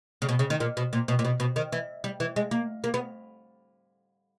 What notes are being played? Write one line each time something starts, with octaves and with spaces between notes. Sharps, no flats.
C#3
B2
C#3
D#3
A#2
B2
A#2
B2
A#2
B2
B2
D#3
E3
G3
E3
G#3
A#3
A#3
B3